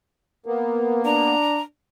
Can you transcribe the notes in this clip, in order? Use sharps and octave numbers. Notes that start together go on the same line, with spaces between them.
A#3 B3 A#4
D4 A#5